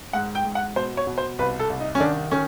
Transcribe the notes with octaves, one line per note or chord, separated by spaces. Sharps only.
G#2 F#5
G5
G#2
F#5
B2 C5
C#5
B2
C5
C2 B4
A4
C2
D#4
C#4
D#3 D4
D#3 C#4